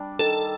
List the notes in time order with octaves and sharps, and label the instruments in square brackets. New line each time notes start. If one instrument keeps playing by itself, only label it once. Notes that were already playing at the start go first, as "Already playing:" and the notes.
Already playing: [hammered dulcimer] G3 D4
[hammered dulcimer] D#3 [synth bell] A4